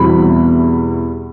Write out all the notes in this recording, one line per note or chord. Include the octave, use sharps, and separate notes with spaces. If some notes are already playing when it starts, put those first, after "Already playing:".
Already playing: E2 B2 G3 C4 E4 B5